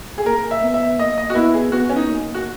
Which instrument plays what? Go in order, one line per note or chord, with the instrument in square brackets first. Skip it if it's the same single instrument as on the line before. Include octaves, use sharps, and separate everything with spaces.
[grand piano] G#4
[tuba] A#3 [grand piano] A#4
[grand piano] E5
[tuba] B3
[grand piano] E5
[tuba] A#3 [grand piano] D#5
[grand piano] D#5
F#4
[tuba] B3 [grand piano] E4
[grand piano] G#4
[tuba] B3 [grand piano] F#4
[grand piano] C#4
D#4
[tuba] A#3
[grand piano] F#4